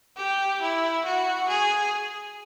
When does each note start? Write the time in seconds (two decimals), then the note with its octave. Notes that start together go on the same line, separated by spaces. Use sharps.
0.17 G4
0.61 E4
1.05 F#4
1.49 G#4